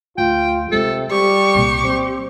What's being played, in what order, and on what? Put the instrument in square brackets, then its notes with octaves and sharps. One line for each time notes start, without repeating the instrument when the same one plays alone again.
[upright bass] D2 [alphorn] F4 [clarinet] G5
[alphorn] C3 [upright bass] G#3 F4 [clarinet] A4
[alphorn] G3 [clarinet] G4 [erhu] C#6
[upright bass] C2 A#2
[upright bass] F#3 [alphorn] C4